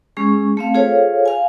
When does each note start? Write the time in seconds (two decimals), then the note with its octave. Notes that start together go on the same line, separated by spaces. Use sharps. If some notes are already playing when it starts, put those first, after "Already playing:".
0.17 G#3 C#4 G#4 C#6
0.57 A3 C4 F5
0.74 F4 G#4 A4 C5 C#5 F5
1.26 F5 G#5